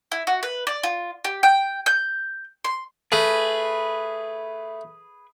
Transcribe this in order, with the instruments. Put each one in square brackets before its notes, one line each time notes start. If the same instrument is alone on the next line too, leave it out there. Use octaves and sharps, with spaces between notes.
[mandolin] E4
F#4
B4
D5
F4
G4
G5
G6
C6
[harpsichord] A3 [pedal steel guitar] G#4 B4